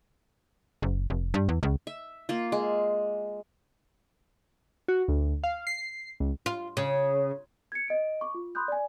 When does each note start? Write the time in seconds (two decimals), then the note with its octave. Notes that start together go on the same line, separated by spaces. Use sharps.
0.82 F#1
1.10 F1
1.34 G2
1.49 E2
1.63 C#2
1.87 E5
2.29 A#3 F4
2.52 G#3
4.88 F#4
5.08 D2
5.44 F5
5.67 C7
6.20 C#2
6.46 F4
6.77 C#3
7.72 G#6 C#7
7.88 D#5 D7
8.21 C#6 D6
8.35 F4
8.55 B5 C6 D#6 F#6 G6
8.68 D5 G#5